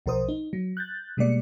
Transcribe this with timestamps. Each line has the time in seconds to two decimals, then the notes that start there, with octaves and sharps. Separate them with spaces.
0.06 B1 F3 A#4 C5 D#6
0.28 D#4
0.53 F#3
0.77 F#6 G6 A6
1.17 B2 G3 G#3 A#3 D5 C#7